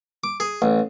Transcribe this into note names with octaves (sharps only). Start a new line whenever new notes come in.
D6
G#4
A1